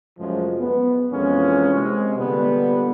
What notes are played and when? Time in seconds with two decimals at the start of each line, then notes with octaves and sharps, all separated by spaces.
0.18 C#2 F#2 A2 F3 G#3
0.60 B3
1.12 F2 A#2 E3 G#3 A#3 C#4
1.73 C3 G#3
2.17 A#2 D3 G3 B3